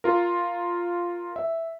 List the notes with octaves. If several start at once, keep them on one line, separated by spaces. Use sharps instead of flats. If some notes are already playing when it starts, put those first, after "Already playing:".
F4 A#4
E5